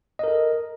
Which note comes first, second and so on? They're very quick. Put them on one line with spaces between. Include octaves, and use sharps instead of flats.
D#5 A#4 A4